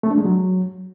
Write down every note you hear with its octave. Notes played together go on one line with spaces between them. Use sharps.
A3
D4
G#3
F#3